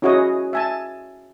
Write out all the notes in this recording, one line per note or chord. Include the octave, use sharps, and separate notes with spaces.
C#4 E4 F#4 G#4 C#5 D#5
E5 G#5 A5